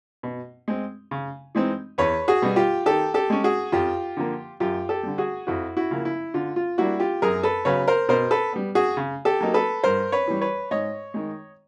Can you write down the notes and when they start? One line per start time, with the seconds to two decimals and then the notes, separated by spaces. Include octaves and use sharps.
0.23 B2
0.68 G#3 C4
1.11 C#3
1.55 E3 G#3 C4 D#4
1.98 E2 B4 C#5
2.28 F#4 G#4
2.42 B2 G3 B3
2.56 F4 G4
2.86 D#3 G4 A4
3.14 G4 A4
3.30 G#3 C#4
3.44 F#4 G#4
3.72 F2 F4 G4
4.17 D3 F3 A#3
4.60 F#2 F4 G4
4.89 G4 A4
5.03 D3 G3
5.18 F#4 G#4
5.47 F2 E4 F#4
5.77 E4 F#4
5.91 C#3 F3 A#3
6.05 E4
6.34 D3 F4
6.56 F4
6.78 G3 A#3 D4 E4 F#4
7.00 F4 G4
7.22 F#2 G#4 A#4
7.43 A4 B4
7.65 C#3 F#3 B3 B4 C#5
7.88 A#4 C5
8.09 B2 A#4 C5
8.31 A4 B4
8.53 G3 B3
8.75 F#4 G#4
8.97 C#3
9.25 G4 A4
9.41 F#3 A#3 D#4
9.54 A4 B4
9.83 G2 A#4 C5
10.12 B4 C#5
10.28 E3 G3
10.41 B4 C#5
10.71 G#2 C#5 D#5
11.14 D#3 G#3